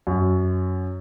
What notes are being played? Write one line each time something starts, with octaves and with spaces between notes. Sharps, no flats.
F#2